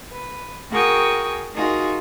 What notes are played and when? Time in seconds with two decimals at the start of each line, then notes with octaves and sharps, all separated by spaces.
0.10 B4
0.72 F#4 G#4 A#4 G5 C#6 D#6
1.55 D#4 F4 F#4 G#4 A#4